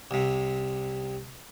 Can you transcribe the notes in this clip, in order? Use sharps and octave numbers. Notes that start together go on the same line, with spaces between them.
C2 C3